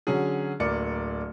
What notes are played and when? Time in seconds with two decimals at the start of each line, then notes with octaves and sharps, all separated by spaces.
0.07 D3 F#3 C#4 G#4
0.60 D1 A#3 D5 C#7